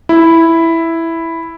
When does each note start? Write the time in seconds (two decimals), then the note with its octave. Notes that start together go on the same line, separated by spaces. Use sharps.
0.09 E4